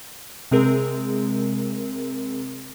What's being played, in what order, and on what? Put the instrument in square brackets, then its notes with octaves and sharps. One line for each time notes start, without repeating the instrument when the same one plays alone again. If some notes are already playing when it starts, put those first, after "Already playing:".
[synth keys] C3 G#3 C4 G#4 A#4